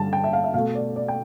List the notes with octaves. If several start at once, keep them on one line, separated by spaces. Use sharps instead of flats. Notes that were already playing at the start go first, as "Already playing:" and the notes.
Already playing: G2 D3 G3 A5
G5
E5
F5
E5
B2 A3 F5
D5
D5
G5